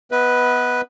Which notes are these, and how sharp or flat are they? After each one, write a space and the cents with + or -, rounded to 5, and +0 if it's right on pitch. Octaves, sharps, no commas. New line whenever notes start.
B3 +0 B4 +0 D#5 +45